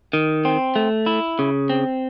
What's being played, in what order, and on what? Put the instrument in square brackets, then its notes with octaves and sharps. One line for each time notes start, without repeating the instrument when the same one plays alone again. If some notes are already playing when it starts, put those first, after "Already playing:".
[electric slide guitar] D#3
C4
A3
E4
C#3
C4